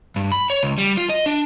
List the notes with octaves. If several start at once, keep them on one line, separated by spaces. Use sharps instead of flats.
G2
B5
C#5
C#2
G3
F4
D#5
D4